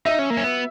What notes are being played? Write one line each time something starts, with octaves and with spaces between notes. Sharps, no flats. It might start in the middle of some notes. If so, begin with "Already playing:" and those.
D#4 E5
C#4
A#3
C#4
B3